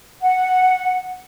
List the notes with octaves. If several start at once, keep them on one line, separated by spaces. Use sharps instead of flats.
F#5